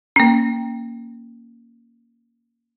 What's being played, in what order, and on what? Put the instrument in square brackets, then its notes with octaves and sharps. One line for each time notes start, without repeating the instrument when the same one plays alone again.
[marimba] A#3 C#4